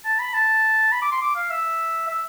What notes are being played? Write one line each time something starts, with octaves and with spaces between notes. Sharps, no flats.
A5
B5
A5
B5
D6
C6
D6
F5
E5
E5